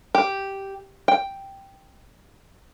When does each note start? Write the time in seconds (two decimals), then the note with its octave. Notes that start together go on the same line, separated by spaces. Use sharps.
0.15 G4
1.08 G5